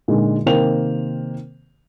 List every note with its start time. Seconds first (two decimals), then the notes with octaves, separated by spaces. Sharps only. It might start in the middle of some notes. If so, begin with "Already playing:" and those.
0.08 A#2 D3 G#3 D#4
0.46 C3 D#3 A#3 C5 G5 F7